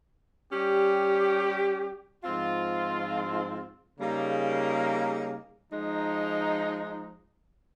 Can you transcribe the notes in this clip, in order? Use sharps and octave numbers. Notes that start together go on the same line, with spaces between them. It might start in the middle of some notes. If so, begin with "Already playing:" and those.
G3 C#4 G4
G#2 F3 C4 F4
C#3 G3 A#3 D#4 G#4
F3 G#3 D#4